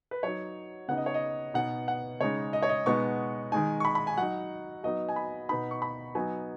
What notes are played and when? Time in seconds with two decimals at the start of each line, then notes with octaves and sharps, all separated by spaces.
0.11 B4
0.23 F#3 D#4 C#5
0.88 C#3 B3 D#4 F#5
0.97 D#5
1.06 C#5
1.14 D#5
1.54 B2 B3 D#4 F#5
1.88 F#5
2.20 C#3 G#3 D#4 C#5
2.53 D#5
2.63 C#5
2.69 D#5
2.86 B2 G#3 B3 D#4 C#6
3.52 D#3 G#3 D#4 G#5
3.80 C#6
3.85 B5
3.95 B5
4.07 G#5
4.17 F#3 D#4 F#5
4.84 F#3 B3 D#4 D#5
5.09 G#5
5.16 B5
5.49 B2 B3 D#4 B5
5.71 C#6
5.82 B5
6.15 F#3 B3 D#4 G#5